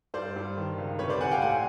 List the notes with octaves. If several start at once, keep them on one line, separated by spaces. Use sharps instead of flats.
G2 C5 D5
G2
D#3
C#2
C3 B4 C#5
C5 D5
C3 F#5 G#5
F5 G5
A2 F#5 G#5